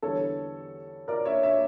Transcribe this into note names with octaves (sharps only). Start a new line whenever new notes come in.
E2 D3 G3 A4 C#5
A#4 D5
C#5 E5
C#5 E5